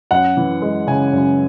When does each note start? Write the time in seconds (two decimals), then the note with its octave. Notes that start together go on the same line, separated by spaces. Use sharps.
0.11 F#2 F#5
0.37 E3
0.62 G#3
0.87 C#3 G#5
1.13 F#2